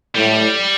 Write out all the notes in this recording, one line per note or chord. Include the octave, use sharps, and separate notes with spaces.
A2 G3